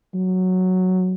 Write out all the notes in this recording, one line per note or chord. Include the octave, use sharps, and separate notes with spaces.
F#3